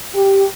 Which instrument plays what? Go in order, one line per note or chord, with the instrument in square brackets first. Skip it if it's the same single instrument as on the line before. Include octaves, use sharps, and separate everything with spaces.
[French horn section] G4